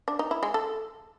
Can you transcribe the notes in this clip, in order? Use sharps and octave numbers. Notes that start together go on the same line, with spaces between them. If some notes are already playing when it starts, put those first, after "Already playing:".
D4
D#4
E4
G#3
A4